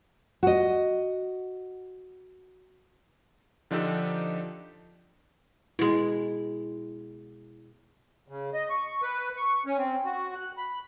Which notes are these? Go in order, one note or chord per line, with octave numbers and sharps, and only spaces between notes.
F#4 D#5
D3 F3 D4 D#4 G4 A4
B2 G#3 E4
C#3
D#5
C#6
B4
C#6
C#4
C4
F#4
F#6
B5